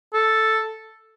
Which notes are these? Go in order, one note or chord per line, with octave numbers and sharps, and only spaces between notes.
A4